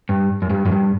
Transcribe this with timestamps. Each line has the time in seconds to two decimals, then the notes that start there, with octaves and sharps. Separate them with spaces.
0.09 G2
0.42 F#2
0.50 G2
0.66 F#2
0.72 G2